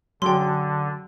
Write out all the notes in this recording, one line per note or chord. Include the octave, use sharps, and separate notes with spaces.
D3 F#3 G#4 G5 C6